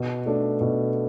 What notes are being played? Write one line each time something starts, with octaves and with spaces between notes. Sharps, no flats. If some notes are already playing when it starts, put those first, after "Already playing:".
Already playing: B2
A3 D4
B2